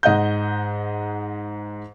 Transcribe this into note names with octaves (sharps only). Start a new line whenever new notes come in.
G#2 D#5 F#5 G6